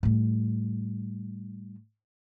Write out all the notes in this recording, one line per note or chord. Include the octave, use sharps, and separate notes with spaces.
A2 G3